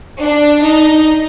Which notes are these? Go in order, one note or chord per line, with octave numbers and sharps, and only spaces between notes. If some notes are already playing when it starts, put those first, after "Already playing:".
D4
D#4